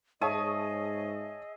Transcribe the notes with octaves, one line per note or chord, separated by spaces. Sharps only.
G#2 G#4 C#5 D#5 E5 A5 C#6 D#6